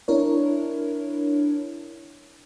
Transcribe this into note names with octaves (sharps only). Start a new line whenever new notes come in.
D4 E4 A#4 C#5